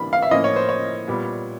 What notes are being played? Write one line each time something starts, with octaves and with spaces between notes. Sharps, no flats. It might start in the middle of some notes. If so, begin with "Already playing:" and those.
Already playing: E3 G3 A#3 D4 B5
F5
E5
A2 F3 A#3 C#4 F4 D#5
C#5
C5
C#5
A#2 G3 B3